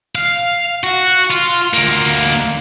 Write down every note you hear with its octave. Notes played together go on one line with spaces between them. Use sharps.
F5
F#4
F4
D2 A#3